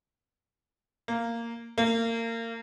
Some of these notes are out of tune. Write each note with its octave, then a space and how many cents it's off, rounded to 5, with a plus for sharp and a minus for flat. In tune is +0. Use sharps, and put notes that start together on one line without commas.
A#3 -10
A#3 -30